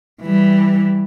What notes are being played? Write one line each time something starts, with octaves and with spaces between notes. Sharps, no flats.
E3 G3